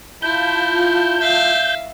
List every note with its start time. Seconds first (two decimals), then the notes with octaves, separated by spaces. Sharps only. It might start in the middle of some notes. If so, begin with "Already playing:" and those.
0.22 E4 F4 A5 G6
1.20 E5 F5